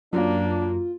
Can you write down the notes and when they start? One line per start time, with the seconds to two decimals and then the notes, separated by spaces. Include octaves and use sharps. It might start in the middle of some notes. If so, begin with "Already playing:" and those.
0.13 F#2 F#3 A#3 D4 F4